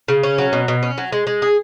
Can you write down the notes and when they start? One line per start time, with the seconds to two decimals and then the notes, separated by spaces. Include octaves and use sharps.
0.08 C#3
0.23 C#4
0.38 F#3
0.53 B2
0.68 B2
0.83 C#4
0.98 F#3
1.12 G#3
1.27 G#3
1.42 G#4